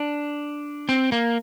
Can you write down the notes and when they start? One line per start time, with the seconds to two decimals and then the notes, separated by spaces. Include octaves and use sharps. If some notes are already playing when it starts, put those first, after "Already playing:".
Already playing: D4
0.89 C4
1.12 A#3